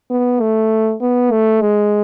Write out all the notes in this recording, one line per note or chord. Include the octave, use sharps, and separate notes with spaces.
B3
A3
B3
A3
G#3